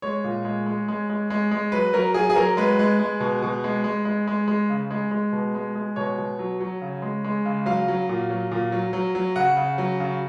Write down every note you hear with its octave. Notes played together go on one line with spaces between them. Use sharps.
G#3 C#5
A#2
G#3
G#3
G#3
G#3
G#3
G#3
F#3 B4
F#3 A#4
F#3 G#4
G#4
F#3 A#4
G#3 B4
G#3
G#3
B2
B2
G#3
G#3
G#3
G#3
G#3
C#3
G#3
G#3
B2
G#3
G#3
B2 C#5
B2
F#3
F#3
C#3
G#3
G#3
C#3
F#3 F5
F#3
A#2
F#3
A#2
F#3
F#3
F#3
C#3 F#5
C#3
F#3
C#3